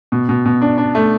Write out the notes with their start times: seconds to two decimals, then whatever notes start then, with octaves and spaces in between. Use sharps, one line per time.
0.12 B2
0.29 B2
0.45 B2
0.62 D4
0.78 D4
0.95 A3